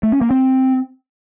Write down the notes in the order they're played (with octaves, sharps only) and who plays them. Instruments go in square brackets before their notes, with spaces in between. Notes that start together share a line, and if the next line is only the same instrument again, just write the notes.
[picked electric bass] A3
C#4
A#3
C4